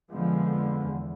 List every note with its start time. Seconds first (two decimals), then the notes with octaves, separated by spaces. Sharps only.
0.12 F2 D3 F3 G#3 B3
0.85 E2